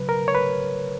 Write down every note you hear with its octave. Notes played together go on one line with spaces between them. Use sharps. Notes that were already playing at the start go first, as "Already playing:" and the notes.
Already playing: C#3 F#3 B4
A#4
C#5
B4